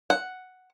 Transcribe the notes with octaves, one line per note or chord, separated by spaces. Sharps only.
F#5